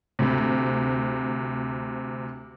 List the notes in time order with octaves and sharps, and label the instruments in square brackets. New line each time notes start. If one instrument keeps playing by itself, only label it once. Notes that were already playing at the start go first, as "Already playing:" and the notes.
[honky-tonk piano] D2 C3